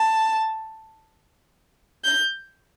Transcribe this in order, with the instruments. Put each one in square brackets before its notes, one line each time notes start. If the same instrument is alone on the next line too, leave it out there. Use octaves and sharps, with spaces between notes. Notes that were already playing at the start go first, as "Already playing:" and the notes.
Already playing: [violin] A5
G6